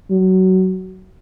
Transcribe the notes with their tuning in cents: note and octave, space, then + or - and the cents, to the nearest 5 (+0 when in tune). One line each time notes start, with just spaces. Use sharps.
F#3 +20